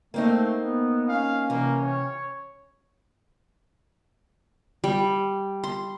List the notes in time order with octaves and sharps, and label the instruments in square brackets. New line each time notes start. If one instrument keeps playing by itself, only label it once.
[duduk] A3 [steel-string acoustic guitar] A#3 C4 D#4
[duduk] B3
[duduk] C#4 [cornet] F5
[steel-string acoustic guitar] C3 E3 [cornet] A#3
[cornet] C#5
[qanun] G3
C6